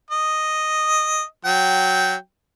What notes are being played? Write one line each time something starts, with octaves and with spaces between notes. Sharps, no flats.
D#5
F#3 G5